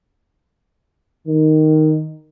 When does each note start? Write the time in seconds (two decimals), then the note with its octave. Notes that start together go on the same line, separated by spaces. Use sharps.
1.27 D#3